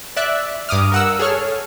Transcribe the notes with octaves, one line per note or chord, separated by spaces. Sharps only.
D5 E5 F#6
G2 D6 D#6 F6
A#4 F#5 E6
G#4 A4 C#5 F6